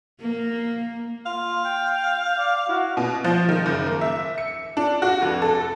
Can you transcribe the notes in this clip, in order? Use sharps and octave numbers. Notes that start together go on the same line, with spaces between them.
A#3
F4 F5
G5
D5
E4 F#4
B2
F3
D#3
F#1
A#3
E5
C#7
D4
F#4
F1
A4